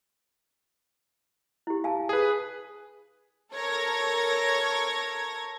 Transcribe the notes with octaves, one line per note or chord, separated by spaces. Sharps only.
E4 G4
F5 G#5 A5
G#4 B4
A4 A#4 C#5 G#6 A#6